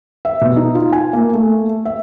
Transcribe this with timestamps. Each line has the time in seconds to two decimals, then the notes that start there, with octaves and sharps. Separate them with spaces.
0.25 E5
0.41 B2
0.56 D#4
0.75 F4
0.92 G#5
1.13 A#3
1.34 A3
1.85 E5